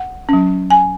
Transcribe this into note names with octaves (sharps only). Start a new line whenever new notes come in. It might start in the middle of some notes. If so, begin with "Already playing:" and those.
Already playing: F#5
F#3 C#4
G#5